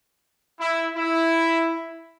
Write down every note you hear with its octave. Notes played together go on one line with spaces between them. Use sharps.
E4
E4